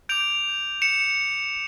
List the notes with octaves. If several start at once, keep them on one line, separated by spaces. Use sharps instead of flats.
D6 G6 D7 F7
C#7 E7